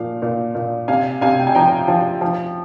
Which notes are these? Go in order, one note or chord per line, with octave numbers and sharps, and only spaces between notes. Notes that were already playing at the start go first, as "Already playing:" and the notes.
Already playing: A#2 F3 F5
A#2
A#2
C3 F5 G#5
C3 F5 G#5
G5
G#5
F3 G5 A#5
F3
F3